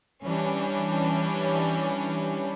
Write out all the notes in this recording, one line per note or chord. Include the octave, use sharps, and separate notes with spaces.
E3 G3 C#4 D4